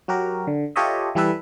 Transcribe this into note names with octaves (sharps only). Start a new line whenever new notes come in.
F#3 F#4 G4 A#4
D3
F4 G4 A4 C#5 D#5 E5
E3 G3 E4 A4 B4 E5